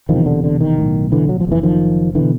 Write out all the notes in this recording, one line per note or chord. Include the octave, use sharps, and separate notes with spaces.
E1 E2 C3 D#3 F3
D3
D3
D#3
B1 A2
D3 E3
F#3
F3
F#1 F2 C3 E3
D#3 F3
B2 D3 E3